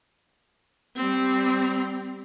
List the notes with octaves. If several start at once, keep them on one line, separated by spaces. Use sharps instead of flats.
G3 C4